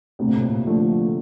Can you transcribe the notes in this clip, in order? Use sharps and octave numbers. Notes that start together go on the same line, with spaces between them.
D2 C3
A#2
A2
A#2
D3 F3 A3